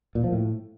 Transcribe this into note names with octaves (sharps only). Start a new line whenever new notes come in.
A#2
F3
A2